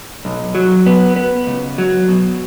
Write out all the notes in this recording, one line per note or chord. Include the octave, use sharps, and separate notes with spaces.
B1
F#3
B3
B3
C#2
F#3
B2